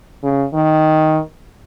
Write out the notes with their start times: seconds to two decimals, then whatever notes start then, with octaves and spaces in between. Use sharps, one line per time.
0.23 C#3
0.54 D#3